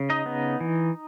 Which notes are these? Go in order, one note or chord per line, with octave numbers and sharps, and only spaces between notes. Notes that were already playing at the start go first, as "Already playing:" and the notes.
Already playing: C#3
D#4 D#5
B3
E3